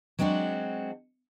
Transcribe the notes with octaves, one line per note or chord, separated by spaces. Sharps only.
F#3 G#3 C4 D4 F#4